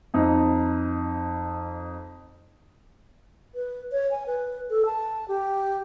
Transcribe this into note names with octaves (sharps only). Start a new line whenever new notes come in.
F2 D#4
B4
C#5
G#5
B4
A4
A5
G4